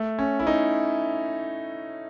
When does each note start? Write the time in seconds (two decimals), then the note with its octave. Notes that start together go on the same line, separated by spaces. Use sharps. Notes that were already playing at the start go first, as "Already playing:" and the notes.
Already playing: A3
0.19 C#4
0.40 E4
0.47 D#4